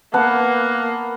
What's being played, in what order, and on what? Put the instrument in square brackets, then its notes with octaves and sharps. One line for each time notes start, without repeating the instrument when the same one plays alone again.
[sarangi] A#3 [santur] B3 F#5 A5